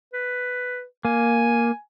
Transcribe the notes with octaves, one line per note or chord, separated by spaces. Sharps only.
B4
A#3 G#5